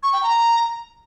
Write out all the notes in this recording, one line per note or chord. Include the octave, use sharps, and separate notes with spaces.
C#6
G5
A#5